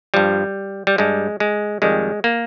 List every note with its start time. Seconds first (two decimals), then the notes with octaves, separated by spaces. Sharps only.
0.14 G2 F3 G3
0.87 G3
0.98 G2 G3 G#3
1.40 G#3
1.82 F2 D#3 G3 G#3
2.24 A#3